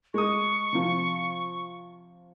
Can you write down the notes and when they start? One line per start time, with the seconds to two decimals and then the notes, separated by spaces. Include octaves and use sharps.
0.14 G#3 C#6 D#6
0.73 C3 F3